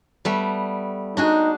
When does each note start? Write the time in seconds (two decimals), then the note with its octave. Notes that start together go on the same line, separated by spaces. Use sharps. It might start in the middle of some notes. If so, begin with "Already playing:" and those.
0.25 G3 A3 B3
1.17 D4 D#4 F#4 G#4